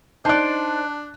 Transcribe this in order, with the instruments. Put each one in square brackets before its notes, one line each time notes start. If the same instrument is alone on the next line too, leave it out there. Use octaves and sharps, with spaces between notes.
[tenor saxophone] D4 [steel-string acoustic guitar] D#4 [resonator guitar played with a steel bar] C5 D5 [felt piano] A5 F#6